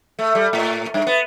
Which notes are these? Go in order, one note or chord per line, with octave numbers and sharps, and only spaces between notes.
A3
G3
A2
G2
B3